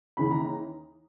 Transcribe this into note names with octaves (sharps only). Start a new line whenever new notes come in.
D#2 C#3 E3 B5
A#5